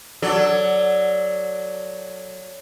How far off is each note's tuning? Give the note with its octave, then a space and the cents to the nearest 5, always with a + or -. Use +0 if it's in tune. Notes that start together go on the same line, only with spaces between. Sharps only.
F#3 +0 A4 +15 D5 +0